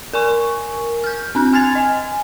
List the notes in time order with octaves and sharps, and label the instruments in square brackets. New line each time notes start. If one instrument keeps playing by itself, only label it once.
[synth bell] A#4 G#5 C#6
F6 G6
C4 D4 F#6
G#5 F6 G#6 A6 F7
D#5 G#5